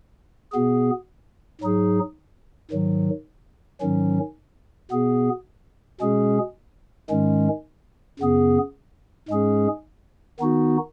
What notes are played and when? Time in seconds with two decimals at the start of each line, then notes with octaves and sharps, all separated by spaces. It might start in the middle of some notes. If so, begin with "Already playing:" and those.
0.52 B2 B3 G#4
1.61 G#2 F#3 D#4 G#4
2.71 G#2 D#3 F#3
3.81 G#2 D#3 F#3 C#4
4.91 B2 B3 G#4
6.01 B2 G#3 C#4 G#4
7.10 G#2 D#3 G#3 C#4
8.20 F#2 C#3 B3 G#4
9.29 G#2 G#3 C#4 G#4
10.40 D#3 B3 D#4 F#4